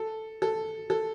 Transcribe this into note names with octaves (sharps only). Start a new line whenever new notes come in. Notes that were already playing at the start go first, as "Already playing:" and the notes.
Already playing: A4
A4
A4